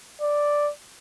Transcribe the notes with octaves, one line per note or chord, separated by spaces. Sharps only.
D5